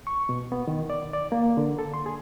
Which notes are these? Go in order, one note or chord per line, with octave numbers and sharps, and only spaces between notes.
C#6
B2
B3
D#3
D5
D5
A#3
D3
A4
C6
G#4